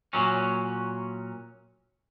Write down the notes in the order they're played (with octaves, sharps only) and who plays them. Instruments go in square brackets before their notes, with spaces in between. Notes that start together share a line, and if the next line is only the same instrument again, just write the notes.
[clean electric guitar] A#2 F#3 C#4